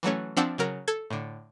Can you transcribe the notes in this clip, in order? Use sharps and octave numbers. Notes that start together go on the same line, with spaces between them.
E3 F#3 A3 C#4
F3 C4 D4 F#5 E6
C#3 F#3 A#4
A4 G#6
A2 D3